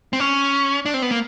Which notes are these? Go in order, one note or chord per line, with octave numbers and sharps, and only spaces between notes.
C4
C#4
D4
C4
B3
A#3